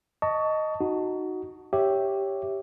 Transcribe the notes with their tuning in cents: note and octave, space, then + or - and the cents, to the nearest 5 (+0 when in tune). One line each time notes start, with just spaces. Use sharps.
D#5 +0 A5 +10 C#6 +25
D#4 +0 F#4 +0
G4 +0 C#5 +0 E5 -5